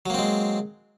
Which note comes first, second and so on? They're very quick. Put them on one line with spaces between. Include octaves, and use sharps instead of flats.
F#3 A#3 C4 G#3